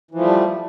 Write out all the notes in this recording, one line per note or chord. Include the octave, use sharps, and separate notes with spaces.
E3 F3 G3 A3